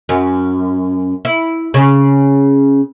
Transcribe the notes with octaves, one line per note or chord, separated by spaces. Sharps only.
F#2
E4
C#3